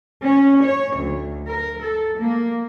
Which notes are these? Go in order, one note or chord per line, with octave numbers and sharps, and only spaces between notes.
C#4
C#5
D2
A#4
A4
A#3